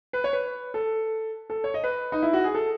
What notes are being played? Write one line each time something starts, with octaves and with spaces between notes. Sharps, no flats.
B4
C#5
B4
A4
A4
C#5
D#5
B4
D#4
E4
F#4
G#4
A4